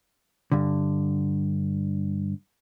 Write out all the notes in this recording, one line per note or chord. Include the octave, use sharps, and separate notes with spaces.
G2 D3